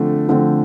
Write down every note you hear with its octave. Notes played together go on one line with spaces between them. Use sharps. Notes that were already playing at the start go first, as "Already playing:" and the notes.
Already playing: D3 F3 A3 C4
D3 F3 A3 C4